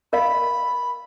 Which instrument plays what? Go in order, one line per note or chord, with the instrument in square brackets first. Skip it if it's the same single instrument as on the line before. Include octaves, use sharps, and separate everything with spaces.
[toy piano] A#4 D#5 F5 [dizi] B5